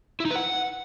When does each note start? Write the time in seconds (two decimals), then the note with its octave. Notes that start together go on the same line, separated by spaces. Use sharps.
0.20 E4
0.25 D#4
0.30 B4
0.36 F#5